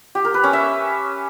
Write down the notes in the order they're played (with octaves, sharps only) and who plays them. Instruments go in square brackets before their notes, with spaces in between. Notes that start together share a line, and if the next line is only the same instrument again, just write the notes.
[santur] G4
A#4
B4
C#4
E5